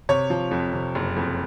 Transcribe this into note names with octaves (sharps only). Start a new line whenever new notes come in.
C3 C#5
F3
F2
C3
F#1
F2